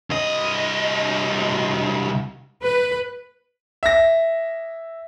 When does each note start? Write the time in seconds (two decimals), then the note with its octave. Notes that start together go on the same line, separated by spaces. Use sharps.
0.10 C2 D#5
2.62 B4
3.83 E5 A#6